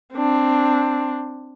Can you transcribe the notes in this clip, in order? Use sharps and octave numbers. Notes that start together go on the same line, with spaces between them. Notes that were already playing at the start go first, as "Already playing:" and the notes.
C4 D4